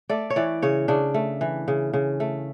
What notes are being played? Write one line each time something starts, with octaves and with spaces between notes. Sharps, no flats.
A3 D5
C#5
E3 D5
C#3 C#5
C#3 D4
A3
E3
C#3
C#3
A3